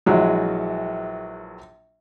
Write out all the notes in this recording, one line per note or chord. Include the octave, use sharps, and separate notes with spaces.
A#1 E3 F#3 G#3